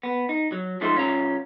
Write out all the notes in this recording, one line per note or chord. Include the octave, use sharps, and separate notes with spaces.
B3
D#4
F#3
F3 G#3 A3 D#4 F4 C5
C2 C#4 F4 A#5